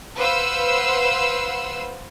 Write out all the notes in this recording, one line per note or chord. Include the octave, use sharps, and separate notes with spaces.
B4 C5 F5 F#5 E6